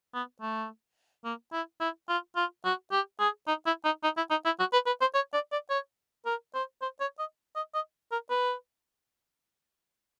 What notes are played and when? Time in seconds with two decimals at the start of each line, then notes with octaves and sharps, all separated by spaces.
0.14 B3
0.41 A3
1.25 A#3
1.53 E4
1.80 E4
2.09 F4
2.36 F4
2.65 F#4
2.92 G4
3.20 G#4
3.48 D#4
3.66 E4
3.85 D#4
4.04 D#4
4.17 E4
4.31 D#4
4.45 E4
4.59 F#4
4.73 B4
4.86 B4
5.01 C5
5.14 C#5
5.33 D5
5.52 D5
5.70 C#5
6.26 A#4
6.54 C5
6.82 C5
7.00 C#5
7.19 D#5
7.56 D#5
7.74 D#5
8.12 A#4
8.30 B4